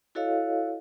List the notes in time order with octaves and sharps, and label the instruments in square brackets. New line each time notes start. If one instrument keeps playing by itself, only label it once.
[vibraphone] E4 F#4 A4 C#5 D#5 F5